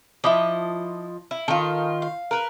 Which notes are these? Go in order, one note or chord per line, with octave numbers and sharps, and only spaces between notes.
F3 E4 D#5 B5 D6
E4
D#3 F4 A4
F5
A#4 B4